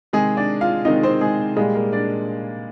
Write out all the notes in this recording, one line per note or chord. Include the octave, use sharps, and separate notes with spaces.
C3 D#3 G#3 G#4
D4 D5
F4 F5
C3 D#3 G#3 D#4 D#5
C4 C5
G#3 G#4
A#2 G3 G#3 G#4
A#3 A#4
D4 D5